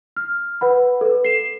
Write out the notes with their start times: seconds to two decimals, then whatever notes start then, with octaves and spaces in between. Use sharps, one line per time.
0.16 F6
0.61 B4 F#5 B5
1.01 A4 B4
1.25 C7 E7